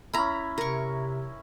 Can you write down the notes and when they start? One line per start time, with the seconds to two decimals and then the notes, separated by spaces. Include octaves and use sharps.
0.14 C#4 E4 A#5 B5
0.58 C3 A#4 C#6